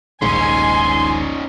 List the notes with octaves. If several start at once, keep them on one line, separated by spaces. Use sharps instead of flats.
D#1 A#1 G#2 C#4 D#4 G#5 C6